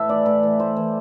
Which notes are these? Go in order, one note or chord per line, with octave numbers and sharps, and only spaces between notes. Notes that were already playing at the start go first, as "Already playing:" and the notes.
Already playing: A2 A4 B4 E5
E3 D5
A2 B4
E3
A2 C5
E3